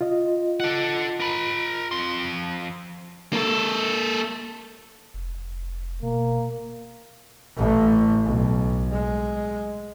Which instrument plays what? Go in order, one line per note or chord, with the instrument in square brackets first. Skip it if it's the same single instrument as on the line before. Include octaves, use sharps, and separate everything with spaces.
[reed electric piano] F4 D#5
[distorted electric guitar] A4 F#5
A#4 B5
F2 C6
[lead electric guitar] A#3 A4
[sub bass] F1
[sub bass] B2 [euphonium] A#3
[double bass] A1 A2
B1
G#3